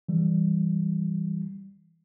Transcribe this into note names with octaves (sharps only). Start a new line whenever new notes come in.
E3 G3